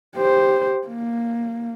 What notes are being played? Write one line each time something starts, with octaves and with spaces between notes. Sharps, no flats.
G4 C5
A#3